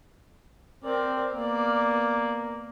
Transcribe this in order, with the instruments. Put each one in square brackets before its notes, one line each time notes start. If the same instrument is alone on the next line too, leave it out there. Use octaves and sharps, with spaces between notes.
[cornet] C4 [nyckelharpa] A#4 D5
[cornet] A#3 [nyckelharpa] B3 D5